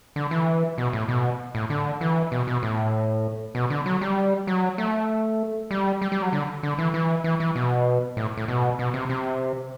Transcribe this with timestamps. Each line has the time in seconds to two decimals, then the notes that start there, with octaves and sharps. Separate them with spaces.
0.16 D3
0.31 E3
0.78 B2
0.93 A2
1.08 B2
1.55 A2
1.70 D3
2.01 E3
2.32 B2
2.47 B2
2.63 A2
3.55 B2
3.70 D3
3.86 F#3
4.01 G3
4.47 F#3
4.78 A3
5.71 G3
6.02 G3
6.12 G3
6.22 F#3
6.33 D3
6.63 D3
6.78 E3
6.94 E3
7.24 E3
7.40 E3
7.56 B2
8.17 A2
8.37 A2
8.48 B2
8.79 B2
8.94 C3
9.09 C3